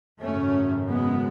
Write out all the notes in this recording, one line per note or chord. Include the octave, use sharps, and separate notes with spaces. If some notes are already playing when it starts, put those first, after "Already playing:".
G#1 F#2 C#3 A3 C#4
G#3 B3